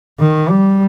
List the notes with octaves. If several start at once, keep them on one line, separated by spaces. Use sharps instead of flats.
D#3
G3